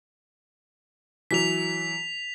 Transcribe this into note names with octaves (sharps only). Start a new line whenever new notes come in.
E3 F#3 B6 F7